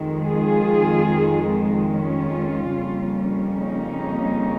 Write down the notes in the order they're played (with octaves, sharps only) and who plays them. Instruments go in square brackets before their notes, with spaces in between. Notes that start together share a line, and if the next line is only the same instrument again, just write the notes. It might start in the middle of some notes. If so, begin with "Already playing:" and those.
Already playing: [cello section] F2 D#3 G#3
F4 G#4
C#4 F4
F2 C#3 G3 A#3 C#4
D#4